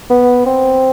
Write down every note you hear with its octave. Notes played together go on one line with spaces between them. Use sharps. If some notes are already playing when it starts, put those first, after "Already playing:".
B3
C4